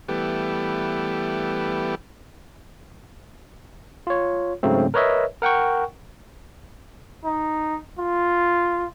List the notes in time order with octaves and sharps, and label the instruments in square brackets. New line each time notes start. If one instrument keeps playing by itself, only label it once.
[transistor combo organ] E3 G3 A3 B3 G4
[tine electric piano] F4 C#5
G#2 C#3 F#3 A3 C4
A#4 B4 C#5 D#5 E5
A#4 F#5 G5 C#6
[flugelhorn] D#4
F4